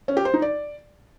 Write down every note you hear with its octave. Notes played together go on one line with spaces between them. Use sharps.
C#4
G4
C5
D#4
D5